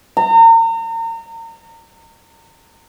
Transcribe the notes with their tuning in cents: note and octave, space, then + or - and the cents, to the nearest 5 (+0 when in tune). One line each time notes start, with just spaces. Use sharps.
A#5 -35